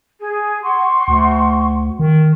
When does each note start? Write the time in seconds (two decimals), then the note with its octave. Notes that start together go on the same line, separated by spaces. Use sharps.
0.19 G#4
0.63 F#5 C6 C#6
1.08 D2
1.99 D#3